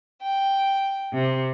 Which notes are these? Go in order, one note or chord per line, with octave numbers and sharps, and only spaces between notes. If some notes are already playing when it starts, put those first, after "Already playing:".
G5
C3